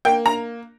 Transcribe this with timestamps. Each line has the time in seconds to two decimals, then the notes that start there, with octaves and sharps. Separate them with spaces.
0.05 A#3 G5
0.26 A#5